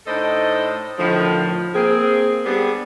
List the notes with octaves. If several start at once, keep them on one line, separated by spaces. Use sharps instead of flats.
A2 D4 D#4 A4 C5 D#5
A2 D3 D#3 F3
A#3 C4 G#4
G3 B3 D4 G4 G#4